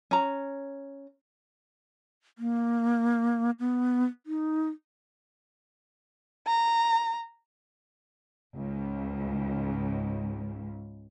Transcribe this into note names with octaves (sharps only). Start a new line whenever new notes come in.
C#4 A#5
A#3
B3
D#4
A#5
C#2 G#2